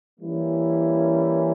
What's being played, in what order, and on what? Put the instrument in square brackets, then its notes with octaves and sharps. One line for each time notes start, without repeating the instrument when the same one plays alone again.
[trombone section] E3 G3 A#3 C#4 E4